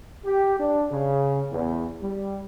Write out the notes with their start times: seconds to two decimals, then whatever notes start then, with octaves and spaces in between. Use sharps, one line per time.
0.25 G4
0.59 D4
0.91 C#3
1.51 E2
2.01 G3